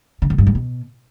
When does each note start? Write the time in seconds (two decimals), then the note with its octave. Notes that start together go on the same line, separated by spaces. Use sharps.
0.22 D3
0.30 D#3
0.38 G2
0.47 G#2
0.55 B2